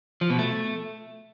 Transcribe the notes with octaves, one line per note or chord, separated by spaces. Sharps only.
F3
B2
A3